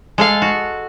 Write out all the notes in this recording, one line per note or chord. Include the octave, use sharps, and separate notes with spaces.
G#3 A4 F5
F#4